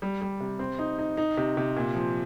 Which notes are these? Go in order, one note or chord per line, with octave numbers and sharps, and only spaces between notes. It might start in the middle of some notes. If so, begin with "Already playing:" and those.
G3
G3
C3
C4
D#4
D#4
D#4
C3
C3
A#2
F3